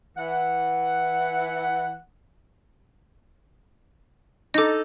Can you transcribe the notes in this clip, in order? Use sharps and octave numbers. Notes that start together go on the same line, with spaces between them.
E3 F#5
D#4 A4 D#5 D6